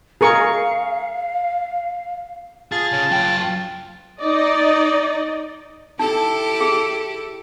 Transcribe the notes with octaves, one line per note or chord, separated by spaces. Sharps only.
G#4 A#4 F5 C#6
F4 G#4 A5
C#3 C#4
F#2 G5
D#4 D5 D#5
D#4 E4 G4 A4
G#4